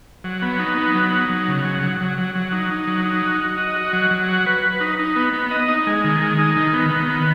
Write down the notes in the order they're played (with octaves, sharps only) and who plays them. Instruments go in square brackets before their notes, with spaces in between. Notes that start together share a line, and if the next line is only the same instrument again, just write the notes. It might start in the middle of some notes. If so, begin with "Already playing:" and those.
[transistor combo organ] F#3
B3
D#4
B3
F#3
D#4
F#3
C#3
F#3
F#3
F#3
F#3
F#3
D#4
D#4
F#3
D#4
F#4
F#4
D#5
F#4
F#3
F#3
F#4
B4
B4
D#4
D#4
B3
B3
D#5
D#4
G#3
D#3
G#3
D#4
D#3
B3
D#3
B3